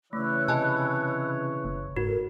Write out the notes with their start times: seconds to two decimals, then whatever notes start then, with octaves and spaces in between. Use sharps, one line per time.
0.13 C#3 E3 A3 C#5 B5 E6 F#6
0.48 C3 D#5 G#5 A5
1.65 F#1
1.97 G#2 F#4 A4 A#4